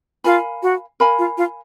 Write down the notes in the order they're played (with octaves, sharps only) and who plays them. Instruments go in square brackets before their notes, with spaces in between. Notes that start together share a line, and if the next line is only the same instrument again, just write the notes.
[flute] F4 [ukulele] A#4 F5 G#5 B5
[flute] F#4
[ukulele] A#4 F5 G#5 B5
[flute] F4
F4